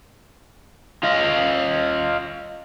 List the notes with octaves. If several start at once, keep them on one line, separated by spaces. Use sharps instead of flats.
F4 D#5 F5